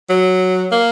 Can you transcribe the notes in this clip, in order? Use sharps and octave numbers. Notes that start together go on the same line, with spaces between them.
F#3
A#3